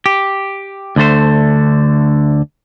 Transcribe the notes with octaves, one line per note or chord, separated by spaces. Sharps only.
G4
D2 D3 A3 C5